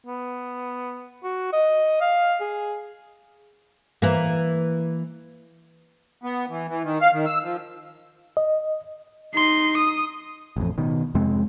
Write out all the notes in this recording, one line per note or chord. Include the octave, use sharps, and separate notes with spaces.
B3
F#4
D#5
F5
G#4
E3 A#3
B3
E3
E3
D#3
F5
D#3
E6
F3
D#5
D#4 C6
D#6
A1 F2
B2 D#3
F2 C3 G#3 C4